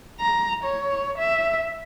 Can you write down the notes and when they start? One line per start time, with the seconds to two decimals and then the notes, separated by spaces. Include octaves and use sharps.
0.21 A#5
0.64 C#5
1.19 E5